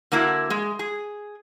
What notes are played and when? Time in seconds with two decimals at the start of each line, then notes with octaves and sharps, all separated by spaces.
0.12 D3 A#3 E4 F#4
0.50 G#3
0.79 G#4